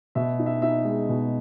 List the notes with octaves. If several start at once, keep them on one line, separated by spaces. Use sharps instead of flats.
B2 E5
D#4
E5
D#4 E5
G#3
B2